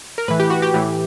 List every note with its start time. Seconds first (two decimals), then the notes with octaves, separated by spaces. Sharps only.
0.18 A#4
0.28 A2 E3 B4
0.40 G4
0.50 F#4
0.62 G4
0.74 A2 E3